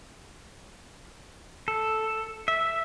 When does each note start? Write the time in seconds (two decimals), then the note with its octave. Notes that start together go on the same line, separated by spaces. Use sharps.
1.68 A4
2.48 E5